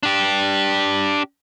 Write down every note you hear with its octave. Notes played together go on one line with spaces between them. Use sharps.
D4 G4